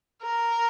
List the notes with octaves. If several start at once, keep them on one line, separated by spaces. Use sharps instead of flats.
A#4